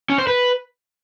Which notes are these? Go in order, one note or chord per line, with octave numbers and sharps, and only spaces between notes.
C#4
C5
B4